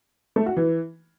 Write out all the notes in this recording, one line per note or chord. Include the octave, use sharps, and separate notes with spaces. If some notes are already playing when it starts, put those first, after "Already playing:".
A3
F#4
E3